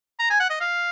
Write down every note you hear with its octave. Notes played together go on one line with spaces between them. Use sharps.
A#5
G#5
F#5
D#5
F5